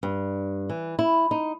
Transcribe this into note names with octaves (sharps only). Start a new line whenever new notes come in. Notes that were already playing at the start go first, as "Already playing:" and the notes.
G2
E3
E4
D#4